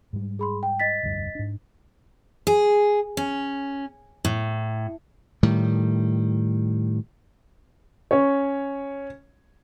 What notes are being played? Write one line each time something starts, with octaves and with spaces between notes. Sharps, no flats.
G#2 G3
G#4 B5 C6
G5
D#5 A6 B6
F1 D2 G2
G#2 D4
G#4
C#4
A2
A2 D#3 G3
C#4 C#5